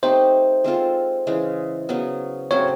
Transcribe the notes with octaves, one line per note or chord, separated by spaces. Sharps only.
A3 C4 D#4 G4 C5
G#3 C4 F4 A4
C#3 E3 G#3
C#3 F#3 B3
C#3 F#3 A3 C4 C#5